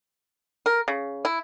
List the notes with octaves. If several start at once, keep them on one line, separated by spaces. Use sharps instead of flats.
A#4
C#3
E4